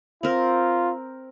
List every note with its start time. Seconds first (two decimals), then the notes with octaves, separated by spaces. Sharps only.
0.23 C4 F4 A#4